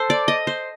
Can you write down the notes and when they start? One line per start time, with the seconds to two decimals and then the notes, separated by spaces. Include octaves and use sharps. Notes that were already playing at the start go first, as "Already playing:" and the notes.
Already playing: A4 C5
0.10 D5
0.28 D#5
0.47 C5